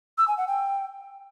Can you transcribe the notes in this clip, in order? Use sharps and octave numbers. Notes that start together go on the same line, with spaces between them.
E6
G#5
F#5
G5